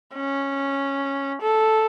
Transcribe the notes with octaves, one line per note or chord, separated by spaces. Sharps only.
C#4
A4